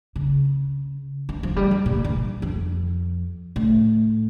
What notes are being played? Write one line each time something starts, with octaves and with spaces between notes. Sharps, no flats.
C#3
E3
F3
G3
F3
A#2
E3
F2
A2